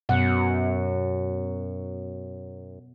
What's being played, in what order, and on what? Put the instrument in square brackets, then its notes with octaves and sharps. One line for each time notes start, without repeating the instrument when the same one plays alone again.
[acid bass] F#2 [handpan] B2 F#5